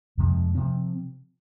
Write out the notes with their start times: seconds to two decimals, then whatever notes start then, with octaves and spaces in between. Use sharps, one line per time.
0.18 F2 C3 F3 G#3
0.55 C3 F3 C4